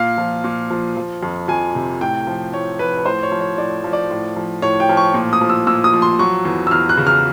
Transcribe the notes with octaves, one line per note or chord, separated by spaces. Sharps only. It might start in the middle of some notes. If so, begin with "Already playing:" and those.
Already playing: A#2 F5
F3
A#2
F3
F3
F2
F2 G#5
C3
A2 G5
F3
A2 C#5
F3 B4
B4
A2 C5
C#5
F3
C#5
A2 D5
F3
D5
A2
F3
A2 C#5
G5
F3
C#6
A#2
D#6
F3
E6
A#2 E6
D#6
F3
C6
F#3 C#6
E2
E6
E2 F6
F#6
C#3
F6